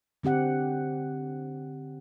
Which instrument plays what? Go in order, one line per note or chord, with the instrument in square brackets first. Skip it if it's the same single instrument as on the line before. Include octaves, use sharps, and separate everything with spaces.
[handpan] D3 C4 G4 F#5